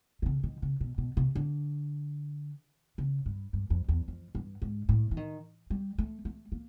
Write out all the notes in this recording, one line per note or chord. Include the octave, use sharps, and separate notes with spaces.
D3
C#3
D#3
C#3
B2
B2
C3
D3
C#3
G2
G2
F2
E2
F2
G2
G#2
A2
E3
D#3
G3
A3
A3
A#3